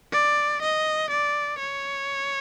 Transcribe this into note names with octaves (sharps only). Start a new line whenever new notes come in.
D5
D#5
D5
C#5